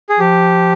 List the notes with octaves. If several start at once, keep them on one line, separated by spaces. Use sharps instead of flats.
G#4
F3 G4